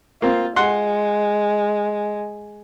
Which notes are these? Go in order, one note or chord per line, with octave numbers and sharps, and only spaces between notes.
A#3 C4 F4
G#3 F#5 C6